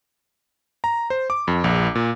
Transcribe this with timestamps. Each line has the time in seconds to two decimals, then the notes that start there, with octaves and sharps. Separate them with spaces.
0.84 A#5
1.10 C5
1.30 D6
1.48 F2
1.64 A#1
1.95 A#2